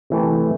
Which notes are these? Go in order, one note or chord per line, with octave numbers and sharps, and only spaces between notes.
C3 E3 A3